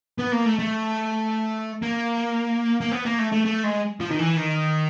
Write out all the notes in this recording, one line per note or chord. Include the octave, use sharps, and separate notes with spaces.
B3
A#3
A3
A3
A#3
A#3
B3
A#3
A3
A3
A3
G#3
F3
D#3
E3
D#3